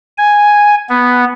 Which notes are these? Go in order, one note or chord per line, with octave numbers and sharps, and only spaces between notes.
G#5
B3